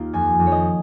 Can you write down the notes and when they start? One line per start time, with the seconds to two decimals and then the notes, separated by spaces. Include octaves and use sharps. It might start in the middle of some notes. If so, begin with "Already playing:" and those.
Already playing: D#2 A#3 F4
0.13 F2 G#5
0.39 F2
0.47 C#5
0.52 D#5